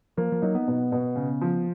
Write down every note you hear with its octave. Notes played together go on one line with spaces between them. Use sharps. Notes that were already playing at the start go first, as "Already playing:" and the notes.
F3 A#3
F3
F#3 D#4
B3
B2
B2
C#3
F3